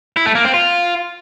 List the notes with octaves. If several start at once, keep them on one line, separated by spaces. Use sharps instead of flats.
E4
A3
A#3
C4
F4